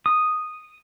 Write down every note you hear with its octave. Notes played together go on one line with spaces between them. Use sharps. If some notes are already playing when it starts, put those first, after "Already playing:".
D#6